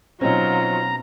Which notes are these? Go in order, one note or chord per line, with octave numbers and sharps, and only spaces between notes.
B2 F#3 C4 C#4 D#4 F4 A#5